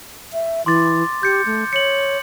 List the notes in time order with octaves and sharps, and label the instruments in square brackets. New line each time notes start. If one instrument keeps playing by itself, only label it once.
[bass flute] E5
[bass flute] E3 [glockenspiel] C6 D6 A6
[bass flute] G4 [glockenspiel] G6 C#7
[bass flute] A3
[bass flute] C#5 [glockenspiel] C#7 F#7